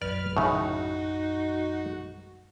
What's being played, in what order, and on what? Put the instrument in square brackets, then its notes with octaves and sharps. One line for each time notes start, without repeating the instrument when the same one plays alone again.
[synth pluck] A#1 F#2 [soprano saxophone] B4 [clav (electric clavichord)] D5 [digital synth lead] F6
[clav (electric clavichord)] A2 C#3 [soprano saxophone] D#4 [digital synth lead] F#4